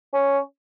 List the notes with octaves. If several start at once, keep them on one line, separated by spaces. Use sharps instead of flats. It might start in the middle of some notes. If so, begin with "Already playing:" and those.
C#4